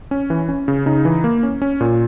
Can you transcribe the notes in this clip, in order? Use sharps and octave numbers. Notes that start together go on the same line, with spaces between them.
C#4
E3
C#4
C#3
C#3 D#4
E3
A#3
C#4
C#4
A#2